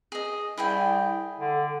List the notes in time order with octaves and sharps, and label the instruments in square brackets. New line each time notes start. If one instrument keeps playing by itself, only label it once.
[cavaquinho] G#4 D#5
[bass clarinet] C2 [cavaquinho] E4 G#4 G5
[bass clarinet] D3